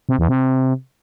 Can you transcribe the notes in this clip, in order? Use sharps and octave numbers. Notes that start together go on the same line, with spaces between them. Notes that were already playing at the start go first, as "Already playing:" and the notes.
C3
E2
C3